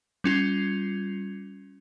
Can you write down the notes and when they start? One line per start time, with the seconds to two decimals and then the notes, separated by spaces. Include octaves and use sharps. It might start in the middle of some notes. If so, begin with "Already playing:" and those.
0.24 G3 C#4 F4